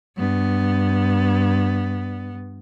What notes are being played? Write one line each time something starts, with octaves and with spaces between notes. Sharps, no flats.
G2 B3